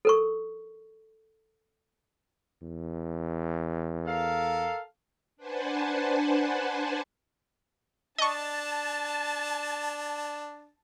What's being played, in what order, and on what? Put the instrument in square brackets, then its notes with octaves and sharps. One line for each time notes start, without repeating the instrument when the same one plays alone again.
[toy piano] A4 A#4 C#6
[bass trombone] E2
[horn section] A4 A#4 F5
[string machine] D4 B4 C5 F#5 G#5 A5
[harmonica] D4 [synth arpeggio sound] D#5 C#6 [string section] A5